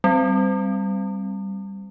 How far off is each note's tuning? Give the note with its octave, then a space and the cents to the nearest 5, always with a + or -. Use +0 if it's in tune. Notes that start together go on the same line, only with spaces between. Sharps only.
G3 +0 C4 +0